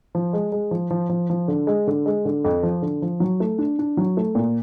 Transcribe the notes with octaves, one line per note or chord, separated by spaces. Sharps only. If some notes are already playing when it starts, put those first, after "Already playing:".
F3
G#3
G#3
F3
F3
F3
F3
D3
G#3
D3
G#3
D3
F2
F3
D3
F3
F#3
A3
D4
D4
F#3
A3
A#2